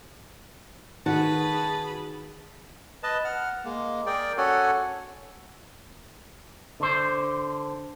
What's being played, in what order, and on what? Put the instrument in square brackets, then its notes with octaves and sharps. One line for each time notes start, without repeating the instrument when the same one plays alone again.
[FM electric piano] D#3 [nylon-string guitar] F#4 [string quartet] G#4 B4 B5 [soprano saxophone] A5
[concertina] B4 D#5 A5
F#5 F6
G#3 A#3
G#4 A#4 D5 G5
C#4 F#4 A4 C#5 F#5 G#5
[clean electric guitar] D3 C5